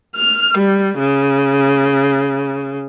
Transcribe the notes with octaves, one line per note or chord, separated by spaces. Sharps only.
F6
G3
C#3